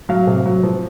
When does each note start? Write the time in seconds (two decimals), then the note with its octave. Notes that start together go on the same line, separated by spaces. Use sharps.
0.09 F#3 F5
0.27 C3
0.46 F#3
0.63 F3